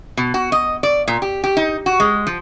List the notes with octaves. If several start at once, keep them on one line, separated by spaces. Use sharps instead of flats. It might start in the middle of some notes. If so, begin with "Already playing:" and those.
B2
F#4
D#5
D5
A#2
G4
G4
D#4
F#4
G#3
F3